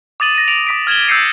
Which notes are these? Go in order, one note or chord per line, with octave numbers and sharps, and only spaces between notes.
D6 D#6 A6 D#7 F#7
A#6 D#7
D7 F7 F#7
D6 B6 D7
F6 G#6 E7 F#7 G7
E6 G6 A6 C7 C#7 D#7